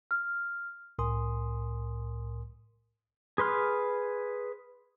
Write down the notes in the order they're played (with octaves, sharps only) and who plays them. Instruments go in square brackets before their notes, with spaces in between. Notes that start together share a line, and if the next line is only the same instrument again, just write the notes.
[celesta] F6
[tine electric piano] C2 A2 A#4 G#5 C6 D#6
[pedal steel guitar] G#4 B4 C6 F6